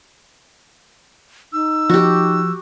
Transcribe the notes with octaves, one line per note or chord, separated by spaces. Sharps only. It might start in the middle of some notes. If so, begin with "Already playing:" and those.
D#4 E6
F3 F#4 G4